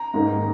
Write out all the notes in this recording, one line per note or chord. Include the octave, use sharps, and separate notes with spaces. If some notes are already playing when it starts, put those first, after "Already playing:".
Already playing: A#5
G#2 D#3 A#3 D#4